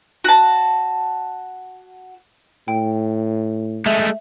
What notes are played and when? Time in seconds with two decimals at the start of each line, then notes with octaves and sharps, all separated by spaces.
0.24 F#4 A5
2.68 A2 G5
3.86 G#3 A3 E5